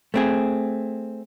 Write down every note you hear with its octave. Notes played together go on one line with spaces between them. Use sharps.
A3 C4 G#4